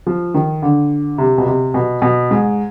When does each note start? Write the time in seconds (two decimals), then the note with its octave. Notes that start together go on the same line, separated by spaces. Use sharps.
0.07 F3
0.34 D#3
0.62 D3
1.18 C3
1.38 B2
1.46 C3
1.74 B2
2.02 B2
2.31 G#2